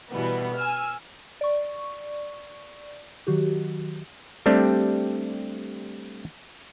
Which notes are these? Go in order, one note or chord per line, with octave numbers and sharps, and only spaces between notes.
B2 E3 G3 B3
G#5 E6 F6
D5 C#6
D#3 F#3 F#4 G4
G3 A3 C4 D4 G4